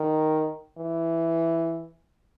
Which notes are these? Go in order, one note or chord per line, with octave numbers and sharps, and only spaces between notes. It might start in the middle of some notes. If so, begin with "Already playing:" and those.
Already playing: D#3
E3